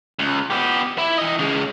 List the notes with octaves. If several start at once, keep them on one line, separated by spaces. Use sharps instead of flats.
C#2
B3 G4
E4
E3 D#5
C#3 G#3